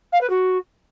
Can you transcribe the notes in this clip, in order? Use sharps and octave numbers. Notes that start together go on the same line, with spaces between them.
F5
B4
F#4